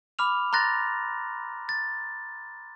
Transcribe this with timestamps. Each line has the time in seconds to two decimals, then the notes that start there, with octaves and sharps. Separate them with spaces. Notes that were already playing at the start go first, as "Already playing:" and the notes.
0.19 B5 D6 F6 F7
0.53 A#5 C6 F#6 A6 A#6
1.69 A6